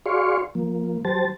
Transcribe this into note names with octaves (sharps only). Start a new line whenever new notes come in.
F#4 G#4 D5 F5 C6 C#6
F3 A#3
F#3 G4 C5 A5 A6